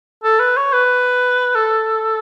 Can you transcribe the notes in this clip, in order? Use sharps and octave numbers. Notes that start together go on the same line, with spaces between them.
A4
B4
C#5
B4
A4